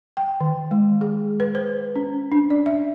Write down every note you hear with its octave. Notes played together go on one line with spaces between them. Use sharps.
G5
D#3
G#3
G#4
B4
C5
C#4
D4
D5
E5